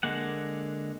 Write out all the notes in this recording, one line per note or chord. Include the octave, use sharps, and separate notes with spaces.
D3 G#3 A#3 F#5